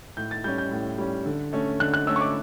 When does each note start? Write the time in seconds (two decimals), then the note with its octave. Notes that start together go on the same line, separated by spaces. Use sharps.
0.17 A2 G6
0.31 A6
0.44 G3 C#4 G6
0.58 G6
0.71 A2
0.98 G3 C#4
1.26 D3
1.53 A3 C#4
1.80 D3 F#6
1.94 F#6
2.07 A3 C#4 E6
2.16 C#6
2.21 D6